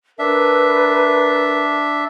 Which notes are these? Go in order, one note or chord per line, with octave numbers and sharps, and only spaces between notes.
D4 A#4 B4 E5